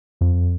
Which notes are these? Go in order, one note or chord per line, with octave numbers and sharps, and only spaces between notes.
F2